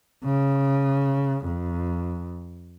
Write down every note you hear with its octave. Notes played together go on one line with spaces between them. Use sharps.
C#3
F2